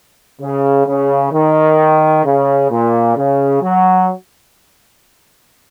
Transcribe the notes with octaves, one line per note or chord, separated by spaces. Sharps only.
C#3
C#3
D#3
C#3
A#2
C#3
F#3